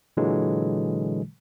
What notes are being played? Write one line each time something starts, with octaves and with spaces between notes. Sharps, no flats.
A#2 D3 E3 F#3 G#3